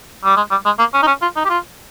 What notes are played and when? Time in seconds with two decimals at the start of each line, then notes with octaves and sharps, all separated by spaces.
0.24 G3
0.37 G#3
0.51 G3
0.66 G#3
0.79 A#3
0.94 C#4
1.03 D#4
1.07 C#4
1.22 F4
1.36 D#4
1.45 G4
1.49 F4